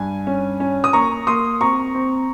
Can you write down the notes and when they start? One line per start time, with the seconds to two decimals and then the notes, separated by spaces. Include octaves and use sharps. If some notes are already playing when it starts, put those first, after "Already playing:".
Already playing: G2 G#5
0.27 C#4
0.60 C#4
0.84 D#6
0.93 A#3 A#5 C#6
1.27 A#3 C6 D#6
1.61 C4 A#5 C#6
1.95 C4